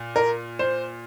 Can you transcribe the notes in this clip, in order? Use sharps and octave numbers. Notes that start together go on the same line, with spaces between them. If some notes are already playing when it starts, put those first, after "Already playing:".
Already playing: A#2
A#4
C5